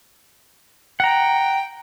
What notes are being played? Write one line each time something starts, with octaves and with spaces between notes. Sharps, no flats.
F#5 G5 A#5